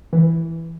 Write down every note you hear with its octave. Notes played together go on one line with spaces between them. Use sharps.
E3